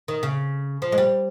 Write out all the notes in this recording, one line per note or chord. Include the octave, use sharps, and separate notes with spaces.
D#3
C#3
F3
G#3
G3